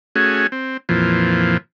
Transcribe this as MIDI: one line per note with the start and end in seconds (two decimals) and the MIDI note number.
0.16 0.47 57
0.16 0.47 61
0.16 0.47 66
0.16 0.47 68
0.52 0.77 60
0.89 1.57 41
0.89 1.57 46
0.89 1.57 52
0.89 1.57 53